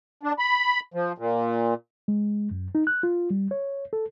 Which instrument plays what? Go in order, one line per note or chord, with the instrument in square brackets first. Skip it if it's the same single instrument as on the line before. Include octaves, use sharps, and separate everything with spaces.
[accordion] D4
B5
F3
A#2
[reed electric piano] G#3
F#2
D#4
F#6
F4
G3
C#5
A4